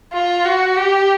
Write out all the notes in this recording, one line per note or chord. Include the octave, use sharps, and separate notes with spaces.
F4
F#4
G4